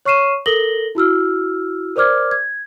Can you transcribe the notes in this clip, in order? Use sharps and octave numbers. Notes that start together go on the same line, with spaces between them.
C#5 C#6 F6 C7 D#7 E7
A4 A#4 A#6 F#7 G7
E4 F#4 E6 F6
A#4 C5 D5 D6 F6 G#6
G#6